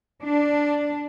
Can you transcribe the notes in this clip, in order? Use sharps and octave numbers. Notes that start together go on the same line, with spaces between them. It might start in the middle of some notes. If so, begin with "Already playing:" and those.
D4